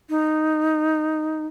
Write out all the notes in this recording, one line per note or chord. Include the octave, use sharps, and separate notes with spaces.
D#4